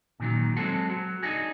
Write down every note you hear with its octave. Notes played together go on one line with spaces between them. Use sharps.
A#2 D#3 F#3
F#3 G#3 C4 F#4 G#4 A4
F#3
D4 D#4 F#4 G#4